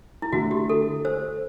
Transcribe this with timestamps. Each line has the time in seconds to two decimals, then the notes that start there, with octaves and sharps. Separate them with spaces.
0.22 E4
0.32 D3 A3 D4 F#4
0.51 G4
0.69 A4
1.05 C5